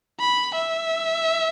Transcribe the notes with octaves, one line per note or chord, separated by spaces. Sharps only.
B5
E5